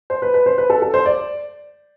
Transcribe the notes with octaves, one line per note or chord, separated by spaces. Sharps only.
C5
B4
B4
C5
B4
A4
A4
C5
D5